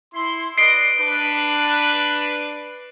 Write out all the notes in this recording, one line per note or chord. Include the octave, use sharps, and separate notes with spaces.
E4 C6
B4 D5 D#5 C7 D7 G7
D4 B4